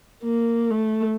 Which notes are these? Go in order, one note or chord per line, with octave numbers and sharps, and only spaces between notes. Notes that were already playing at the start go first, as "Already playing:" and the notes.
A#3
A3